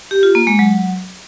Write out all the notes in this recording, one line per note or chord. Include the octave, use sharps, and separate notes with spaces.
G4
F4
A#3
G#3
F#3